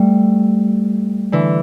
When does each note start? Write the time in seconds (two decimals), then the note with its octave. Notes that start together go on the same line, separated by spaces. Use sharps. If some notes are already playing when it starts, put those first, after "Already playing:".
Already playing: G3 A3
1.32 D3 E3